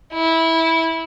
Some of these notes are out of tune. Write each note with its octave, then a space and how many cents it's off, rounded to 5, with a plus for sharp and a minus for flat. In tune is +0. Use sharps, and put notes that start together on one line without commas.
E4 -15